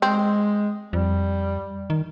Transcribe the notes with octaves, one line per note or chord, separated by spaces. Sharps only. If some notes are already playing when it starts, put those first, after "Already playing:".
G#3 C4
F2 G3
D#3